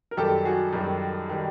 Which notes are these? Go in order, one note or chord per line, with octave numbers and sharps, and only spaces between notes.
A#4
F#2 D#3 G3 G4 A4
F#4 G#4
F#2 D#3 G3
D#3 G3